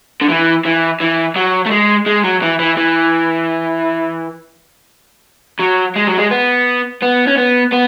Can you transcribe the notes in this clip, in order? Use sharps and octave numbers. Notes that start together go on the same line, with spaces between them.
D3
E3
E3
E3
F#3
A3
G#3
G#3
F#3
E3
E3
E3
F#3
G#3
F#3
G#3
B3
B3
C#4
B3
B3